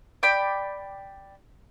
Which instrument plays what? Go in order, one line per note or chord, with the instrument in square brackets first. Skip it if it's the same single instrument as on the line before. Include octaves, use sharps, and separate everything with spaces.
[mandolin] D5 G5 B5